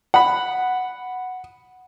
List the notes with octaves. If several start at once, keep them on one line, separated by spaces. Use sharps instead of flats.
F#5 B5